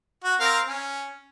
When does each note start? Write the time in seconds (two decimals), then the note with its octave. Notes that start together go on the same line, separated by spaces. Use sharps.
0.24 F#4
0.40 C4 A#4 F5
0.68 C#4